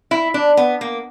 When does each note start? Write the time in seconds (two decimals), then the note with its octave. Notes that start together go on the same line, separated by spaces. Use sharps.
0.11 E4
0.34 D4
0.57 B3
0.81 A#3